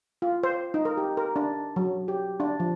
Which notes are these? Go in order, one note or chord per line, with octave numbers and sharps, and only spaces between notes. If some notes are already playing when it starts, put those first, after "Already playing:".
F4
C5
D#4
A#4
G4
A#4
D4
F#3
G4
D4
F3